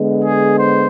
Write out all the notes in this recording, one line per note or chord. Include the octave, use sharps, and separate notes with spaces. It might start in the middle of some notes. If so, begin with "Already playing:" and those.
Already playing: D3 G#3 B3
G#4
C5